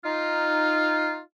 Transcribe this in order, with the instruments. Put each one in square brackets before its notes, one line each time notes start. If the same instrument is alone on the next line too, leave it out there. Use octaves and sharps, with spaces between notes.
[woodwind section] D#4 F4